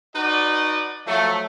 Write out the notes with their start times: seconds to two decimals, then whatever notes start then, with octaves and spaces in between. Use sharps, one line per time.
0.15 D#4 F#4 B4 D5 D#5
1.07 F3 F#3 A3